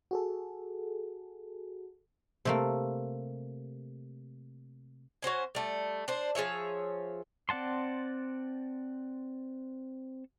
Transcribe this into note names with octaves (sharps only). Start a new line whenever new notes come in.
F#4 G#4 A4
C3 A3 A#3
C#4 F#4 C5 G#5
G3 A3
D4 C5
F3 G#4 C#5 E5
C4 D5 F#5 A5 C6